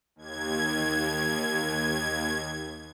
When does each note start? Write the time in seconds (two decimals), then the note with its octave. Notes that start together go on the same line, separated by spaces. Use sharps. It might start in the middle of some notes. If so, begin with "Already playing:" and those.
0.16 D#2 G#6